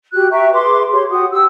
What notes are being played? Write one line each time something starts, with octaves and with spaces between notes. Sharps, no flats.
F#4 G4 F#6
E5 G5 A#5 C#6
G#4 B4 C6 D6
G4 C#5 C6
F#4 G4 F#5 D#6
G4 E6